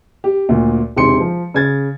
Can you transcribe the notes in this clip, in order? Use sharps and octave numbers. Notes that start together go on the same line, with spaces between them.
G4
D2 A#2
E1 C3 D#4 G4 C6 C#7
F3
C#3 G#6 A6